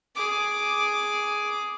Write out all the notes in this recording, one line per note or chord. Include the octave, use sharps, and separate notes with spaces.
G#4 D6